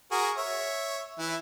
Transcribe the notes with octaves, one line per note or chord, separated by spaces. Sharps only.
F#4 G#4 A#4
C#5 E5
E3 E4